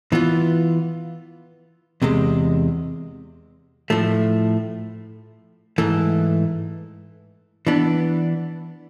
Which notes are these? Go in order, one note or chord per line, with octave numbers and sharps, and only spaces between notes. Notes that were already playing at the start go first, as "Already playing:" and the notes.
E3 B3 F4
E2 C3 G#3
A2 F3 A3
G#2 E3 A3
E3 B3 D4